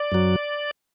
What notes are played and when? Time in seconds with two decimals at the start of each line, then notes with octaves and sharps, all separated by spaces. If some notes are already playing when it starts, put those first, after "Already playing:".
Already playing: D5
0.12 F#2 F#3